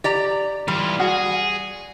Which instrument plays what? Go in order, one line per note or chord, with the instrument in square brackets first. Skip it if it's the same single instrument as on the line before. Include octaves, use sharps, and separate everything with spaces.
[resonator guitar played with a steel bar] G4 D5 A#5
[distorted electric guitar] E3 F4 [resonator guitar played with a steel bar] G3
[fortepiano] F#4 [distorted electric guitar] G#4